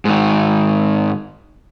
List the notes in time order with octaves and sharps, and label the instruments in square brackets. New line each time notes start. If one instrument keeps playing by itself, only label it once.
[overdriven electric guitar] G#2 D#3